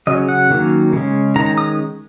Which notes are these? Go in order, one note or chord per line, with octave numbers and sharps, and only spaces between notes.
C#3 F#3 C#4 D#5
F#5
D#3 F#3 A#3 C#4
C#3 G#3 C#4
D#3 G#3 C#4 A#5
A#5
D#6